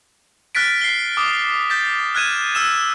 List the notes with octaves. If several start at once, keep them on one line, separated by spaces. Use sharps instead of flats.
F6 F#6 A6 B6 D7
C7 G7
D6 D#6
G6 A6 B6
F6 F#6 G#6 D#7 E7
E6 F6 E7